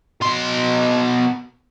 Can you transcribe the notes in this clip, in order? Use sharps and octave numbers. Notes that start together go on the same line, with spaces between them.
B2 C6